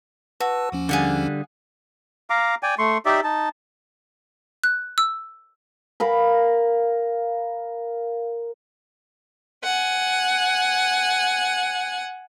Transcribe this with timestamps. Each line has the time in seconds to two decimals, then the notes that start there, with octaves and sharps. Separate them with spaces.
0.40 F#4 B4 A5 E6
0.72 D#2 F3 C#4
0.89 D3 G3 G#4 F5 F#5
2.30 F5 A#5 D6
2.63 D5 G5 G#5
2.78 A3 C6 C#6
3.06 D#4 G4 D5 E5
3.24 D#4 A5
4.64 F#6
4.98 E6
6.00 A#4 F5 B5
9.64 F#5 G#5